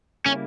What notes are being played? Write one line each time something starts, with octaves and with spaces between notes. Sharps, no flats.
C#3 G3 A#3 C#4 E4